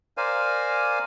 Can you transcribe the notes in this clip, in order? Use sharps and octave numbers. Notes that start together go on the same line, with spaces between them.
A#4 C5 D5 F5 G#5